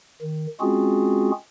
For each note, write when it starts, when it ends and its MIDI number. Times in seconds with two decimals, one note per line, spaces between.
0.22 0.47 51
0.60 1.31 56
0.60 1.31 60
0.60 1.31 61
0.60 1.31 65
0.60 1.31 66
0.60 1.31 68